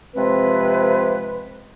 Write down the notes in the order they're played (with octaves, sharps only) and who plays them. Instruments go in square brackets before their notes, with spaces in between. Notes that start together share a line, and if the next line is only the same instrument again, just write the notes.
[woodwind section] C3 F3 G#3 C4 B4